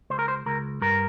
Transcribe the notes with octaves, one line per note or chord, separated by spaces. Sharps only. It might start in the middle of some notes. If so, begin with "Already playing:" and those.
C#2 C5
A#4
C5
C#2 A#4
G2 A#4